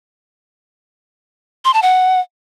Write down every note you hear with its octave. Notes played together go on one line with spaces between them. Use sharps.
C6
A5
F#5